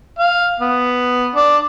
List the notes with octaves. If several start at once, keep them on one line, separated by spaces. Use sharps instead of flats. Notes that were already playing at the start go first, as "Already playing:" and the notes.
F5
B3
D4